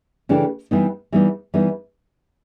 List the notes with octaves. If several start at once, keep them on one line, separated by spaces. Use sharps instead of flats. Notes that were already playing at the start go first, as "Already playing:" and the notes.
C#3 E3 A3 D4 G4
E3 G3 B3 D#4
E3 G3 B3 D#4
E3 G3 B3 D#4